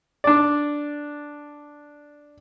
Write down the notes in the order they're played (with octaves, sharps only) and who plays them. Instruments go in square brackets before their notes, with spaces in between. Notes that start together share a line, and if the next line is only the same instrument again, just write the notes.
[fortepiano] D4 D5